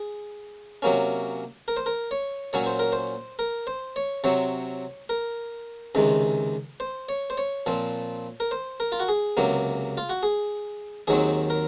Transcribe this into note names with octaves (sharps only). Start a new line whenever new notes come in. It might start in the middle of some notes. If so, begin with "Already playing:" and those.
Already playing: G#4
C3 F#3 A#3 C#4
A#4
C5
A#4
C#5
A#2 F#3 C#4 C#5
C5
A#4
C5
A#4
C5
C#5
C3 F#3 C4 C#5
A#4
C#2 C3 D#3 G#3
C5
C#5
C5
C#5
A#2 F3 C4
A#4
C5
A#4
F4
F#4
G#4
C#2 C3 F#3 A#3
F4
F#4
G#4
D#2 D#3 F#3 C4 G#4
A#4